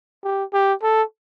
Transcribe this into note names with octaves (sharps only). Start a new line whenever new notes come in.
G4
G4
A4